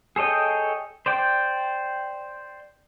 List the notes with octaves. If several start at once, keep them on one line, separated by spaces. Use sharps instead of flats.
G#4 A4 C#5 D#5 G5
C5 D5 G5